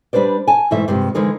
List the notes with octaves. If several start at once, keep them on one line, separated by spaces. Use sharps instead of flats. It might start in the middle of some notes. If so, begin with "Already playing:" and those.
G3 D4 B4 C5 D5
G#5 A5
G#2 B2 E3 A3 E5
G2 C3 F3 G#3 C4 G4
D3 E3 F3 G#3 D#4 A#4